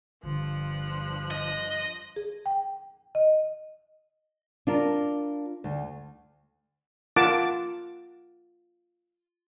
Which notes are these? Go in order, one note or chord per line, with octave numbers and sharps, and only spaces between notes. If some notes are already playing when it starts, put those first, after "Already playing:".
G1 G2 D3 F3 F#6
D#5
G#4
G5
D#5
D4 F4 A#4
D2
F4 A#4 F#5 A5 D6